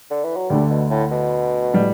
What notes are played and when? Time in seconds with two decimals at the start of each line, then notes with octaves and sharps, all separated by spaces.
0.11 D3
0.24 E3
0.36 F#3
0.49 D2 D3 G3 A3
0.70 B2
0.90 A2
1.11 B2
1.73 A2 G3